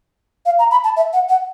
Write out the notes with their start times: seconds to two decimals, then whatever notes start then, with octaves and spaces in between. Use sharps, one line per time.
0.46 F5
0.59 A#5
0.71 B5
0.84 A5
0.97 E5
1.13 F#5
1.29 F#5